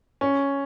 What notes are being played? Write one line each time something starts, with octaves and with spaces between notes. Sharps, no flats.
C#4